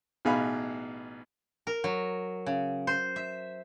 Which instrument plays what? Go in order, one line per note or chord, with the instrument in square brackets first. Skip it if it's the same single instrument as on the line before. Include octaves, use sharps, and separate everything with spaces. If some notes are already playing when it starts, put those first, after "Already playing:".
[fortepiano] A1 B2 D#4 G#4 F5 B5
[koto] A#4
F#3
C#3
C5
E5